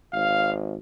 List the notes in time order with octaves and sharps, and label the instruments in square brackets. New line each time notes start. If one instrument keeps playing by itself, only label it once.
[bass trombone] G#1 [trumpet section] F5